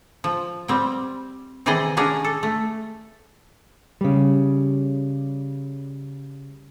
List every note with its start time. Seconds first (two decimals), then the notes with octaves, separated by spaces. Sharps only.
0.24 F3
0.68 G3 C4 G5
1.66 C3 D#3 E3 G#4 D5 D#5
1.97 C#4 D4 G#4 A#4
2.24 A4
2.43 A3
4.01 C#3 G3